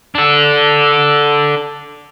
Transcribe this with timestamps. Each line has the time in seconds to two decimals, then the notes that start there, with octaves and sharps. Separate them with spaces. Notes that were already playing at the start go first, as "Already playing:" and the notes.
0.15 D4 A4